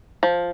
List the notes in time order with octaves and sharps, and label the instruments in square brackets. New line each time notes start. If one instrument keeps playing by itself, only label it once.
[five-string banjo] F3